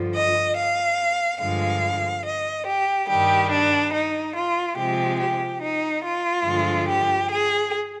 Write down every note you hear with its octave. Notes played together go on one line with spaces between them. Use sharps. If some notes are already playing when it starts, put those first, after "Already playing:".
Already playing: G2 D3 F3
D#5
F5
G2 D3 F3 G#3 F5
D#5
G4
G2 D#3 G3 G4
D4
D#4
F4
C3 F3 G#3 G4
G4
D#4
F4
G2 D3 F3 G#3
G4
G#4